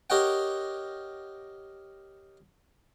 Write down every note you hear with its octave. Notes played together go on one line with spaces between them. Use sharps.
G4 A#4 C#5 D#5 F#5 G5